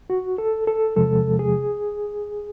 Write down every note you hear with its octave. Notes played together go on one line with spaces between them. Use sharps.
F#4
A4
A4
E2 C3 F3 G#3 A4
G#4